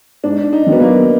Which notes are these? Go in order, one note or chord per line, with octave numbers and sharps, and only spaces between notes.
G#2 D4
D#4
D#3 F#3
B3
A#3